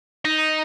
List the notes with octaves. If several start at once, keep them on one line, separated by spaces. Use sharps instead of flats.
D#4